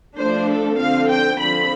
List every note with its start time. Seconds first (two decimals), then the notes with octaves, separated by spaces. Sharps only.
0.17 F3 A3 D4 C5
0.48 A4
0.78 D3 F3 C4 F5
1.08 G5
1.39 D3 F3 C4 B5